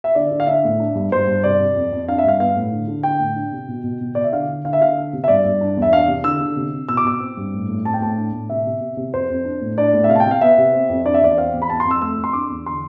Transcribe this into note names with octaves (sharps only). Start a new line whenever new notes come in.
E5
D3 D5
D3
F5
D4 E5
A2
D4
G2
G2 C5
G2
C3 D5
C3
F2
F2
D4 F5
E5
G2 F5
B3 F5
A2
D3
D3
D4 G5
A2
D4
C3
B2
B2
B2
B2 D5
E5
D3 F5
D3
D3 F5
E5
D3 F5
D4
C3
E5
G2 D5
G2
D4
E2
E5
D4 F5
C3
D3 E6
D3
C3
C3
B2 E6
D6
B2 E6
C4
G2
A2
A2
C4 A5
G5
A2 A5
D4
A2
C3 E5
C3
C3
C3
F2 C5
F2
D4
A2
D4 D5
A2
E5
C3 F5
A5
G5
C3
F5
B3 E5
C3
C4
F2
D4 D5
E5
E2 D5
C4 F5
E2
B5
B3 A5
C6
F2
E6
A3 E6
F2
C6
D4 D6
E2
D3 C6